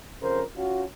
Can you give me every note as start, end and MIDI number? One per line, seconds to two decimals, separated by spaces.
0.21 0.42 41
0.21 0.42 49
0.21 0.42 70
0.21 0.42 72
0.56 0.84 61
0.56 0.84 65
0.56 0.84 66